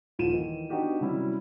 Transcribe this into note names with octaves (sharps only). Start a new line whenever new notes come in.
D#1 F3 D#7 E7
D#3 E3
B3 D4 D#4 F#4 G4 G5
C3 F#3 G3 C#4 E4